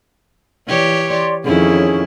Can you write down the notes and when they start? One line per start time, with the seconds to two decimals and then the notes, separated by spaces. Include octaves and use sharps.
0.67 E3 G4 C#5 D5
1.08 D5 C6
1.44 F2 D#3 C#4 E4 G#4